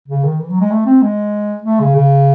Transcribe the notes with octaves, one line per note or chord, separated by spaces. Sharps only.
C#3
D#3
E3
F#3
G#3
A3
C4
G#3
A3
C#3
C#3